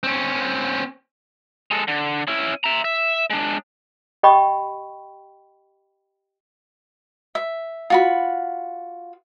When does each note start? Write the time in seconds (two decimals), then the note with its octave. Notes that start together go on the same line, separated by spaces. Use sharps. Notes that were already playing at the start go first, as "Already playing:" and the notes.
0.03 C4 C#4
1.71 G#3 A4
1.88 D3
2.28 C#4 E4
2.64 E5 A#5
2.84 E5
3.30 G#3 D4
4.23 G4 D#5 G5 B5 C#6
7.35 E5
7.90 F4 F#4 B5